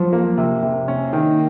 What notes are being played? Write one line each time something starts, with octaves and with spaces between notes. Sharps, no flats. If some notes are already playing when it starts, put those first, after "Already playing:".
Already playing: F3 F#3
A#3
C3
C3
A#3 C#4
D#3